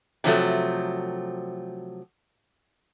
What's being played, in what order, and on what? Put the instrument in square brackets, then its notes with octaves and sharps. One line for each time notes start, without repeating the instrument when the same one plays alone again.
[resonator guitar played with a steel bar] C3 F3 F#3 A3